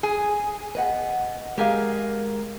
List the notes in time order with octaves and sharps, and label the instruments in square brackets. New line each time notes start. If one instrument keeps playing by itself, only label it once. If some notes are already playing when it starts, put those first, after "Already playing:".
[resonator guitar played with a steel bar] G#4
[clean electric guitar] B4 D#5 F#5
[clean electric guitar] G#3 A#4 [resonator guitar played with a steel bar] G4 G#4 F5